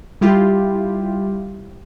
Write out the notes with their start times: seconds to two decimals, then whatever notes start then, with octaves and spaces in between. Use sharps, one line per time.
0.21 G3 E4 F4 G4